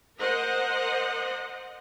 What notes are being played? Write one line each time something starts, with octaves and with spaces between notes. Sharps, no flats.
A#4 C5 D#5 F#5